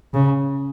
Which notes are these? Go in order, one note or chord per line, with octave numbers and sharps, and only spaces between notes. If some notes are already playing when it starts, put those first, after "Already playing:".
C#3